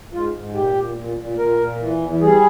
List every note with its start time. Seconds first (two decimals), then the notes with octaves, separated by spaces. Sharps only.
0.13 G#2 F4
0.34 G#2
0.54 A#2 G4
0.75 A#2
0.96 A#2
1.16 A#2
1.38 A#2 A#4
1.58 A#2
1.79 E3
2.00 E2
2.21 G3 G#4